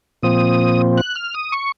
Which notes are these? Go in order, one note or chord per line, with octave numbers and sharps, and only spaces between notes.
A#2 F3 C4 D#6
F#6
F6
D#6
C#6